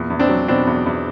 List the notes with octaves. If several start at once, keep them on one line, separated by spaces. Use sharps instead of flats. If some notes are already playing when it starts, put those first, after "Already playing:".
Already playing: E2 A#2
E2
C4 D4
F#3
B2 C4 D4
E2
E2